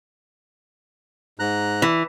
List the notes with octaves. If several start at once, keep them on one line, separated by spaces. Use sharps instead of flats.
G#2 A#5 F#6
E3